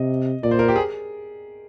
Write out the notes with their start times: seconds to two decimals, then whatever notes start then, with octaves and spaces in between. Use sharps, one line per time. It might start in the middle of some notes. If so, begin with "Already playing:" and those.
Already playing: C3 D#5
0.43 A#2 D5
0.51 C5
0.59 A#4
0.68 G4
0.76 G#4